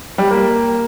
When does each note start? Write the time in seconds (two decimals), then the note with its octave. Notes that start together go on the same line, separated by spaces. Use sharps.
0.18 G3
0.31 A#3